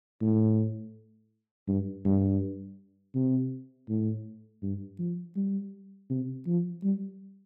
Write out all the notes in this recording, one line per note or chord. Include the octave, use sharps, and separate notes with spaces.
A2
G2
G2
C3
A2
G2
F3
G3
C3
F3
G3